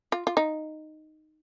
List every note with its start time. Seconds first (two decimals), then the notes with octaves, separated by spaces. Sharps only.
0.12 F4
0.27 F4
0.37 D#4